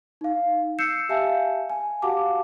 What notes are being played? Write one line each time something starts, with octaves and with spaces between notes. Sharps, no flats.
D#4 F5
E6 G6 C7 C#7 E7
G4 E5 F5 G#5 A5
G#5
F#4 G4 F5 F#5 A5 D6